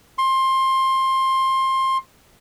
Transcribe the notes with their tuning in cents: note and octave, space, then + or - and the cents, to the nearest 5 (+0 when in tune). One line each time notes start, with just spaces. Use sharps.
C6 +20